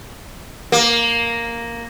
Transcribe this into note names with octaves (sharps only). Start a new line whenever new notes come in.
A#3